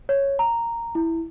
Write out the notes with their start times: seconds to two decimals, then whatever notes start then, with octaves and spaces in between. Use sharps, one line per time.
0.09 C#5
0.39 A#5
0.95 E4